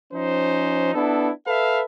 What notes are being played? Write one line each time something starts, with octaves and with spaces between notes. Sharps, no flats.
F3 C#4 D#4 C5
B3 D4 E4 A4
A4 B4 E5 F5